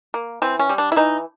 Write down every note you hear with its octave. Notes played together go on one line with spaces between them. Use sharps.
A#3
E3 C4
C#4
G3
D4
E4
E3 D#4